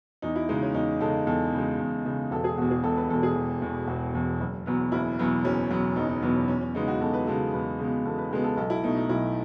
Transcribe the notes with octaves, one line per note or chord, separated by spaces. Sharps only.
E2 D#4
E4
C#3 G#3 D#4
C#4
E2 D#4
C#3 G#3 A4
E2 A4
C#3
G#3
E2
C#3 G#3
E1 A4
G#4
E2 B2 F#4
G#4
E1 A4
B4
E2 B2 A4
G#4
E1
E2 B2
E1 F#4
E2 B2
F#1
E2 B2 F#3 B3
F#1 E4
E2 B2 F#3 B3
F#1 C#4
E2 B2 F#3 B3
F#1 D#4
D#4
E2 B2 F#3 B3
C#4
E2 C#4
C#4
C#3 G#3 B3 D#4
F#4
E2 A4
B4
C#3 G#3 B3 A4
E2 B4
C#3 G#3 B3
E2 A4
B4
C#3 G#3 B3 A4
A4
B1 A4
E4
B2 A3 D#4
D#4
B1 E4